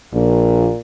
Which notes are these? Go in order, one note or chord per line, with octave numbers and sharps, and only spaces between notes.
A#1 A#2